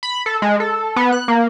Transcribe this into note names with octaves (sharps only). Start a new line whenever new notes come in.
B5
A4
G#3
A4
B3
F#6
A#3